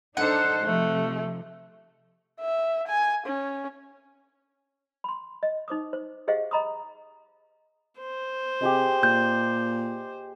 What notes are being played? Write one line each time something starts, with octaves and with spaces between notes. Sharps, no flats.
D4 D#4 A4 C5 F#5
C3 F3 A3
E5
G#5
C#4
B5 C6
D#5
D#4 C5 D6 D#6
C5
G4 G#4 C5 D#5 F5 F#5
D#5 A#5 B5 C#6 D#6
C5
C3 G4 G#4 D#5
A#2 G6